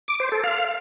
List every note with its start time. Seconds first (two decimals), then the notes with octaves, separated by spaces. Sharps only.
0.08 D6
0.20 C5
0.32 A4
0.44 F5